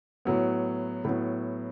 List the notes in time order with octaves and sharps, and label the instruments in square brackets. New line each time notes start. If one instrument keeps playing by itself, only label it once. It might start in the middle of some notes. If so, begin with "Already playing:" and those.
[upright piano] A2 F#3 B3
A2 F#3 B3